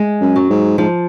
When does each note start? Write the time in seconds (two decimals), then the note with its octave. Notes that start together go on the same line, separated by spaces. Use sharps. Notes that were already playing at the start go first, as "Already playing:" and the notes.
Already playing: G#3
0.21 F#2
0.36 F#3
0.50 G#2
0.78 G#2 F3